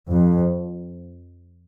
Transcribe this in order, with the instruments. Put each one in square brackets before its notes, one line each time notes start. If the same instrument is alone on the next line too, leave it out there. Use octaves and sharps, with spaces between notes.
[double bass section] F2